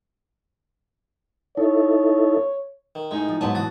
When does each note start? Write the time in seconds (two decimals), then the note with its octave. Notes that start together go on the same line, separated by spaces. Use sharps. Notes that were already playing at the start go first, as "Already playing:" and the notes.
1.57 D#4 E4 A4 C#5
2.95 D#3
3.11 A2 G#3 D#4 G#5
3.28 F3
3.41 G#2 F#3 B3 A5
3.55 C3 E3 F#4 D#6 A6